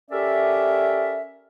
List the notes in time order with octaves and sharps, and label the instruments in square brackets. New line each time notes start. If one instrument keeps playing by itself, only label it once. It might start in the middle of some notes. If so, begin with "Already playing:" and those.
[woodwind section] C#4 G4 A4 A#4 D5 E5